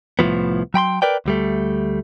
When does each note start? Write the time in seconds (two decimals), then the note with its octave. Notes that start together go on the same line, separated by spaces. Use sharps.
0.19 C2 A2 E3 F3 B3
0.74 F#3 G5 B5 C6
1.02 A#4 B4 D5 G5
1.26 D2 G3 A3